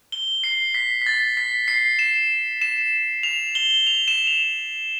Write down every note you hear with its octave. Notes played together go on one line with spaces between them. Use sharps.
G7
C7
B6
B6
A6
B6
C7
E7
E7
F7
G7
F7
E7
F7